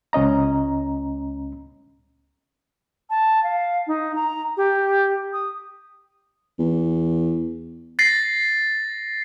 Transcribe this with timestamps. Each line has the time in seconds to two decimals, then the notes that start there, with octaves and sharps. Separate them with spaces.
0.13 C#2 C#4 D#5 A#5
3.10 A5
3.44 F5
3.87 D#4
4.15 A#5
4.57 G4
5.33 D#6
6.59 E2
7.99 A6 A#6 C7